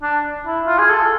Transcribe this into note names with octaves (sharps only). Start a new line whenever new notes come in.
D4
E4
F4
G#4
A4